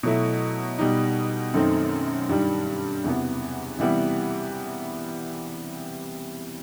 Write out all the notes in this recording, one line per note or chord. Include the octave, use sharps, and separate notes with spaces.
B2 F#3 A3 E4
B2 G3 D#4
F#2 D#3 A3 C4 D#4
G2 D#3 G3
E2 C3 E3 B3
C3 E3 G3 B3 E4